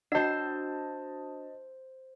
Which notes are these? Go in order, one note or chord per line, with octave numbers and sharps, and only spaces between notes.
D4 F#4 C5 D#5 A5 E6